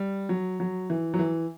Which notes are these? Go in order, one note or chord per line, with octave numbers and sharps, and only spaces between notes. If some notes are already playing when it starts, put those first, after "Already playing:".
Already playing: G3
F#3
F#3
E3
F#3
E3